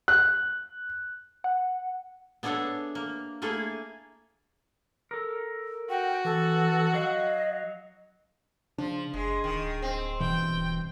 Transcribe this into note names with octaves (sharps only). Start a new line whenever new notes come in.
F#6
F#5
B3 D4 G#4 A4 C#5 E5
A#3
A3 A#3 E4 G#4 A4
A4 A#4
F#4 G5
E3 A4
F#3 D#5 F5
C#3 F3 D4
F#1 G#3 G#4
D1 D#3
C4
G2 B2 E3 G5
D1